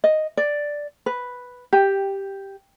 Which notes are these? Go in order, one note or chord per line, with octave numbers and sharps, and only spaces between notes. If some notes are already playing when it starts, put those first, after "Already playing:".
D#5
D5
B4
G4